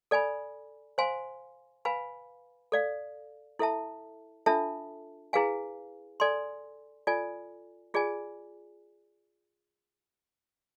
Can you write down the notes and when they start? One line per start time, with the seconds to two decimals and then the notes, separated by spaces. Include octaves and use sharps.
0.11 A4 D5 G#5 B5
0.98 C5 F5 G#5 C6
1.85 B4 F5 G#5 B5
2.72 A4 D5 F5
3.59 E4 A4 E5 A5
4.46 D4 F4 A4 E5 A5
5.33 E4 G#4 B4 F5 G#5
6.20 A4 D5 G#5 C6
7.07 F4 A4 D5 G#5
7.94 F4 G#4 D5 G#5